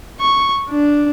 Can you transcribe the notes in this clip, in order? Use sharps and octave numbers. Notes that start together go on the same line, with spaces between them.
C#6
D4